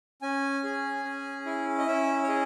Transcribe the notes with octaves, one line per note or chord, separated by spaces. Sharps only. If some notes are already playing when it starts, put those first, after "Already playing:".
C#4 G#5
G#4
C#4
E4
D#5
C#4 E5
C#5
G#4 D#5